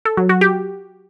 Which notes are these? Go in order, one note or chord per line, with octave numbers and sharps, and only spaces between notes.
A4
F#3
F#4
G4